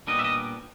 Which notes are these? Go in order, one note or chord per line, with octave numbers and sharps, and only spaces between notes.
A#2 G3 B3 D4 D#5
E5
D#5